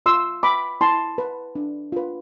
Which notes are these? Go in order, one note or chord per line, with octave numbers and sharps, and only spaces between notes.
F4 C6 E6
B4 B5 D6
E4 A5 C6
B4
D4
F4 B4